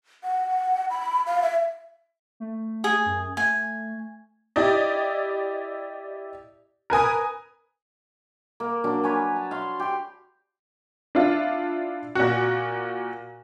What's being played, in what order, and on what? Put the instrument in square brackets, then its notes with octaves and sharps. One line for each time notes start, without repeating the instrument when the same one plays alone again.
[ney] F#5
B5
F5
E5
[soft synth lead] A3
[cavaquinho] G#4
[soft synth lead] F#2
[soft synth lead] A3 [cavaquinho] G#5
[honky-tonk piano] E4 G4 D5 D#5
A#4 B4 G#5 D#6
[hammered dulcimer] A#3
F#3 A#3 D4
B4 C#5 G#5
A5
F5 C6
G4 C6
[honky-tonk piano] D4 E4 F4
A#2 F#4